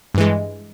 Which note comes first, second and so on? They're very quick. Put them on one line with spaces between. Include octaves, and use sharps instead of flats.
G2 E3 G#3